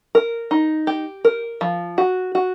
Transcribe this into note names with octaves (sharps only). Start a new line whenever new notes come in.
A#4
D#4
G4
A#4
F3
F#4
F#4